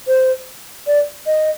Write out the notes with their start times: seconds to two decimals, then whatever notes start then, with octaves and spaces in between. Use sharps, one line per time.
0.08 C5
0.87 D5
1.26 D#5